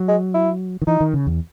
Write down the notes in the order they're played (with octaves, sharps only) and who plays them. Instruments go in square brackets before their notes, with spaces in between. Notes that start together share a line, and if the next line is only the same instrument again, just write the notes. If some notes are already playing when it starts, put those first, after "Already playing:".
Already playing: [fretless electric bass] F#3
[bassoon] G#3
E4
[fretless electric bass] D#3
[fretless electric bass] E3 [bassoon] D#4
[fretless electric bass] D#3
C#3
E2